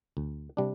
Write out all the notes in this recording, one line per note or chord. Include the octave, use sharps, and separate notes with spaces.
D2
C3 G3 D4